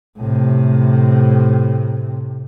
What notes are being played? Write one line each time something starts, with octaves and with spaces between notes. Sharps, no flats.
A2 C3